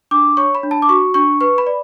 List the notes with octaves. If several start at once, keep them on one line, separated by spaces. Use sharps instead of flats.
D4 D6
C#5 C#6
B5
D4
A5
D6
F#4 C#6
D4 C#6
B4 C#6
B5
D5